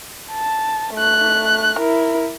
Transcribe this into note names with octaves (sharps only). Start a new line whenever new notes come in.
A5
A3 F#6
E4 A#4